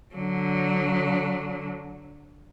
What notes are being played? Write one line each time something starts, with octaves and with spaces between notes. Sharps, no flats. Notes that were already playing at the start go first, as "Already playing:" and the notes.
D3 F#3